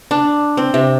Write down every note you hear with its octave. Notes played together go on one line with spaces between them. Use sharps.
D4
C4
C3